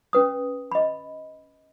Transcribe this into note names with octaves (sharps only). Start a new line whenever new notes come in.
C#4 B4 D#6
D#5 B5